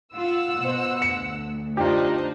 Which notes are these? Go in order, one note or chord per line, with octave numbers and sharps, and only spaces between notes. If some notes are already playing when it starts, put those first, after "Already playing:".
F4 F5 F#5 E6
B2 C5
D2 C#7
D4 D#4 F4 G4 C5